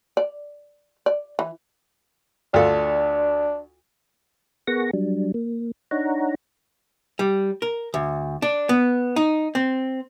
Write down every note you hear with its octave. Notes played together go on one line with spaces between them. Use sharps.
D5
D5
E3
D2 D4 F4 A4
B3 G#4 A#4 F#5 C#6 A#6
F#3 G3 D4
A#3
D4 D#4 C#5 F#5 A#5
G3
A#4
D2
D4
B3
D#4
C4